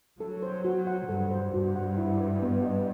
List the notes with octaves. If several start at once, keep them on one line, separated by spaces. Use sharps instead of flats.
F#3 A4
C5
F#4
F#5
G2 A4
C5
G2 F#4
F#5
E4
B4
B3
D#5